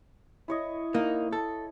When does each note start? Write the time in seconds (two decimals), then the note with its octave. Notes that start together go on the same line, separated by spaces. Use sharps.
0.48 E4 C#5 D#5
0.94 A#3 D#4
1.33 A4